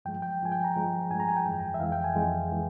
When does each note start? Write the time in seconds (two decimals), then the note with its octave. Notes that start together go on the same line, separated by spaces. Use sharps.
0.05 G2 F3 G#3 G5
0.22 G5
0.41 G2 F3 G#3 G#5
0.52 G5
0.64 A#5
0.76 G2 F3 G#3
1.10 G2 F3 G#3 G#5
1.20 A#5
1.28 G#5
1.36 G5
1.46 F2 E3 G#3
1.74 E5
1.80 F2 E3 G#3 F5
1.92 G5
2.04 G#5
2.15 F2 E3 G#3
2.52 E3 G#3